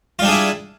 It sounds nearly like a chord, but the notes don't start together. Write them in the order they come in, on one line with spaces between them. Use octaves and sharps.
F4 G3 D4 G#4 E4